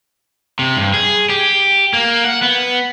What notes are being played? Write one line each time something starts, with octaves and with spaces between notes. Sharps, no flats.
C3
G2
G#4
G4
A#3
F#5
B3